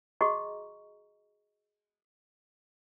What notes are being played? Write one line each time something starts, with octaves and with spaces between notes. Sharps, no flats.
F#4 G#4 D#5 A#5 C#6